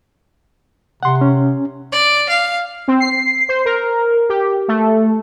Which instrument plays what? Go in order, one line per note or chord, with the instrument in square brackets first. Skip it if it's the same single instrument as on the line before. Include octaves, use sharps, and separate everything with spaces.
[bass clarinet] C3 [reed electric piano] F#5 C6
[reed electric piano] C#4
[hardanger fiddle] D5
F5
[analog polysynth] C4
C7
C5
A#4
G4
A3